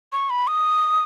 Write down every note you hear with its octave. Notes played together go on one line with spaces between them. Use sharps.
C#6
B5
D#6